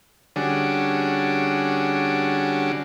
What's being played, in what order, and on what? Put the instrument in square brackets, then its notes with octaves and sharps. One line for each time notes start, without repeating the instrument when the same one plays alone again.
[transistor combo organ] D3 G3 C#4 D4 F#4 G#4